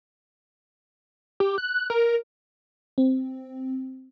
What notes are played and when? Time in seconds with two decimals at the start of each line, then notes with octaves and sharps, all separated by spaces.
1.40 G4
1.58 F#6
1.90 A#4
2.98 C4